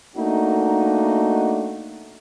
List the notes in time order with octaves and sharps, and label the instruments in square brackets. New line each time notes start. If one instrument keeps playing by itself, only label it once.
[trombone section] A3 A#3 D4 D#4 F#4